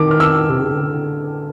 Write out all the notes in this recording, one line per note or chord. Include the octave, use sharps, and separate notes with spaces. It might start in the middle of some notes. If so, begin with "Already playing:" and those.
Already playing: D#3 D6
F6
E6
C3
C#3
D3